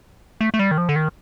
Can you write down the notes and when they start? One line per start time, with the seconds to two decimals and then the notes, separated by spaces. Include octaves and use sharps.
0.41 A3
0.54 A3
0.59 G3
0.71 D#3
0.78 F3
0.89 D3
0.96 D#3